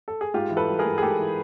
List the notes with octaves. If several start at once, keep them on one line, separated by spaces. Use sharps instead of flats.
A4
G#4
G#2 F4 G4
E3
A4 B4
G3
G#4 A#4
G#2
G#4
G#2 G4 A4
E3